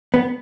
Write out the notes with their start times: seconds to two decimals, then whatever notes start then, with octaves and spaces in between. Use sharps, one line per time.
0.14 B3